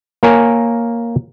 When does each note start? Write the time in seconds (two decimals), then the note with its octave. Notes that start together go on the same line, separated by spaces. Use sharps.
0.23 A#3 A#4 C#5 G#5